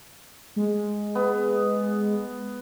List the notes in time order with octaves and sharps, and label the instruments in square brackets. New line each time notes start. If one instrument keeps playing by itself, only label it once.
[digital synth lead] G#3
[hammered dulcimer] B3